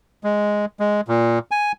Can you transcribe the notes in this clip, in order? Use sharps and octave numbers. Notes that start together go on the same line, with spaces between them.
G#3
G#3
A#2
G#5